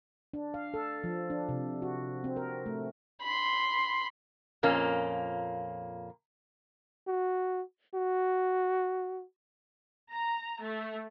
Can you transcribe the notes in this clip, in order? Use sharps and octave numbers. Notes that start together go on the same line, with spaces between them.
D4
F5
A4
F3
D4
C3
F#4
C4
A#4
A3
B5 C6
F2 A#2 A#3 C#4
F#4
F#4
A#5
A3